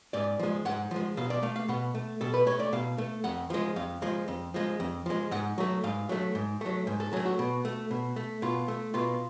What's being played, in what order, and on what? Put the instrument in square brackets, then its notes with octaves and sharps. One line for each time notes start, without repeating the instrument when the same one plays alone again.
[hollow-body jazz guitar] G#2 D5
F3 G#3
G#2 F#5
F3 G#3
B2 F5
D5
A3 F5
F5
B2 F#5
A3
B2 A4
B4
A3 C#5
D5
B2 F5
A3
F2 F#5
F3 G#3
F2 F5
F3 G#3
F2
F3 G#3
F2
F3 G#3
G#2 F#5
F#3 A3
G#2 F5
F#3 A3
G#2
F#3 A3
G#2
A4
F#3 A3 G#4
F#4
B2
A3
B2
A3
B2 F4
A3
B2 F4